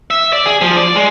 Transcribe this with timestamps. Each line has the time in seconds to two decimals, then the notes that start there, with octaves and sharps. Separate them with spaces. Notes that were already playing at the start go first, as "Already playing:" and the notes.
0.11 E5
0.33 D5
0.46 G#4
0.61 F3
0.77 D5
0.96 G#3